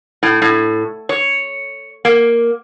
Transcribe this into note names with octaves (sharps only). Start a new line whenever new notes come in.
A2
A2
C#5
A#3